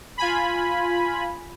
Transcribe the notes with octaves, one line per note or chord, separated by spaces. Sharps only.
F4 G#5 B5